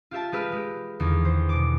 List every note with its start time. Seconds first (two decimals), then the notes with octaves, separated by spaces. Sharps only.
0.11 F4 G4 E5 A5
0.32 G#3 G4 B4 E6 F6
0.52 G#3 G4
1.00 E2 D3 D#3
1.25 C5
1.49 B2 D6